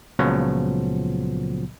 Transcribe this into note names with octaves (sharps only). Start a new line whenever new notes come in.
C#2 A#2 C#3 F3 F#3 B3